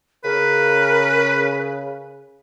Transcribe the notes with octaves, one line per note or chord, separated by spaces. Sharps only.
C#3 A#4 B4